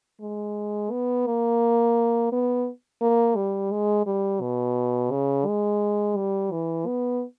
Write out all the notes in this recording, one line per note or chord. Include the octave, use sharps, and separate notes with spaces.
G#3
B3
A#3
B3
A#3
G3
G#3
G3
B2
C#3
G#3
G3
E3
B3